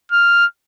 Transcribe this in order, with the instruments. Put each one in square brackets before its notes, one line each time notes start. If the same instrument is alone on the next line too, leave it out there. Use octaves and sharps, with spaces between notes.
[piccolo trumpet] F6